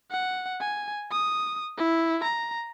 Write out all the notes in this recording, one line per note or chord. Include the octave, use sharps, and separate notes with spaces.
F#5
G#5
D#6
E4
A#5